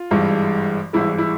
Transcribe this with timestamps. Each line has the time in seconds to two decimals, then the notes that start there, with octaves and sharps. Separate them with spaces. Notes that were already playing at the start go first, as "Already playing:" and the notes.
Already playing: F4
0.11 G#1 G2 E3 G#3
0.93 G#1 G2 E3 G#3 E4
1.18 E4